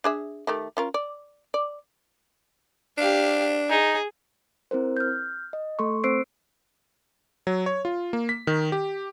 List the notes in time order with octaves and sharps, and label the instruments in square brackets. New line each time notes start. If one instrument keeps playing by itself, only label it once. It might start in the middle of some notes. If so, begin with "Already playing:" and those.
[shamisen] D4 G#4 E5
D#3 A3 G4
C#4 F4 A#4
D5
D5
[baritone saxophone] D4 [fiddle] G4 F5
[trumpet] D#4 [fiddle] G#4
[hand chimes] C4 E4 A#4 C5
F6 G6
D#5
A3 A4 C6 C#6
C4 C5 E6 C7 D7
[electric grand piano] F#3
C#5
F4
A#3
B6
D#3
G4